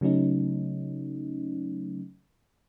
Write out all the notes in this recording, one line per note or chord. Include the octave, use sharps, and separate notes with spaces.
C#3 F#3 A3 C#4 D#4